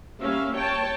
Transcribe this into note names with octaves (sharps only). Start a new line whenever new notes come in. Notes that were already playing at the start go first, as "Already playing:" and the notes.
G3 A#3 C#4 E5 F5
C#5 G5 A5